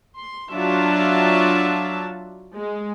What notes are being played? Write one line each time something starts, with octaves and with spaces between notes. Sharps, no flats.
C6
F#3 D4 F4 F#4 E5 A5
G#3